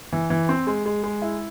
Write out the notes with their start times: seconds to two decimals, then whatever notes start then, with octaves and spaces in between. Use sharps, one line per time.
0.13 E3
0.30 E3
0.49 C4
0.67 G#3
0.86 G#3
1.04 G#3
1.22 E4